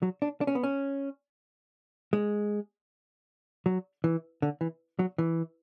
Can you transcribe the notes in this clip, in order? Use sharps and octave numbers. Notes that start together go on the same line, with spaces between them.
F#3
D4
D4
C#4
B3
C#4
G#3
F#3
E3
D3
E3
F#3
E3